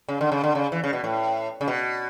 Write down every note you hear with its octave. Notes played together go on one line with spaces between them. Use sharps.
C#3
D3
C#3
D3
C#3
E3
C#3
B2
A2
C#3
B2